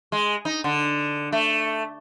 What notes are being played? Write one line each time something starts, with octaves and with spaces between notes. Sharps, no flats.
G#3
D#4
D3
A3